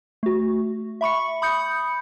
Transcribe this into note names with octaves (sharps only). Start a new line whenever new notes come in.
A3 F#4
E5 B5 C#6 C#7
B5 D#6 G6 C#7